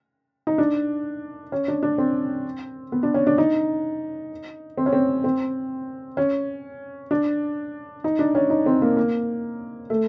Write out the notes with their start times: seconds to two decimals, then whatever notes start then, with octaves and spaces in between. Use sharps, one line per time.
0.47 D#4
0.58 D4
1.52 C#4
1.68 D4
1.83 D4
1.98 C4
2.92 B3
3.03 D4
3.14 C#4
3.27 D4
3.38 D#4
4.77 C4
4.86 C#4
4.93 C4
5.24 C4
6.17 C#4
7.11 D4
8.04 D#4
8.19 D4
8.35 C#4
8.50 D#4
8.66 C4
8.82 A#3
8.97 A#3
9.90 A3